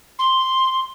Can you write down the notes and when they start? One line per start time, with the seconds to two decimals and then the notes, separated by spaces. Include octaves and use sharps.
0.19 C6